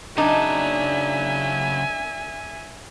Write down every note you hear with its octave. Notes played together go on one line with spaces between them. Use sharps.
C#3 F#3 D4 D#4 E5 G#5